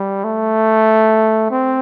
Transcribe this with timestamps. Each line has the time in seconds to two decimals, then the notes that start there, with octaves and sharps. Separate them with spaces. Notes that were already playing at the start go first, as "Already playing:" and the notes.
Already playing: G3
0.24 A3
1.51 C4